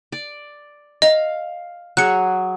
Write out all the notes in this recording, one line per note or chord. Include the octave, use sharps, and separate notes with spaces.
D5
D#5 F5
F#3 G#4 F#6 C#7